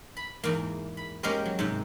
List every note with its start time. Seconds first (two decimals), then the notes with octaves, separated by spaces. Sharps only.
0.17 B5
0.44 E2 G#2 A#3
0.97 B5
1.23 G#3 A#3 C#4 G4 A#4 C5
1.46 F#3
1.59 G#2 C3